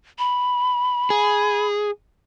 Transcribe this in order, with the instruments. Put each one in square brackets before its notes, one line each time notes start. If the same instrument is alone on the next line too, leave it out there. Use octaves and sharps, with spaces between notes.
[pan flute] B5
[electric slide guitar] G#4